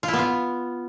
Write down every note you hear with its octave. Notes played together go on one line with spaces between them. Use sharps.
F4
E4
B3
F4